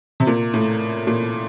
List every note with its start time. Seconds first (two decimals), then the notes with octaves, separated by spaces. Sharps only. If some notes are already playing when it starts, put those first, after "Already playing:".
0.20 C3
0.27 A#2
0.54 A2
1.07 A#2